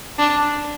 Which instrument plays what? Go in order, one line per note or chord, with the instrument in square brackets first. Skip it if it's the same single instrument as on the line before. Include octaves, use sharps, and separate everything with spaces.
[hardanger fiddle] D4